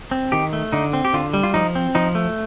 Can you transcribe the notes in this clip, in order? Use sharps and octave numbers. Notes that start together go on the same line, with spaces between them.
C4
D#3 G4
A3
D3 D#4
C4
G4
D3 F4
G3
F4
F3 D#4
C4
F3 D#4
A3